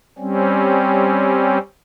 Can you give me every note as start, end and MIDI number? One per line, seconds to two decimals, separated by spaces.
0.18 1.58 55
0.18 1.58 60
0.18 1.58 61